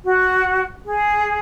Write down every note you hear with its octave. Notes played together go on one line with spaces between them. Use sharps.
F#4
G#4